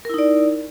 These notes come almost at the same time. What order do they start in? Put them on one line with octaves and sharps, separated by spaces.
A#4 E4 D#4 D5